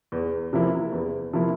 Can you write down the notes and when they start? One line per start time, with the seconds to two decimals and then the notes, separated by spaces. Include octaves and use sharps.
0.12 E2
0.53 C3 F3 A#3 E4
0.92 E2
1.33 C3 F3 A#3 E4